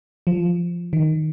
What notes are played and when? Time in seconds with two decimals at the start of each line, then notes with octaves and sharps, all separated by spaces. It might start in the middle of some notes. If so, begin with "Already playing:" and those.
0.27 F3
0.93 D#3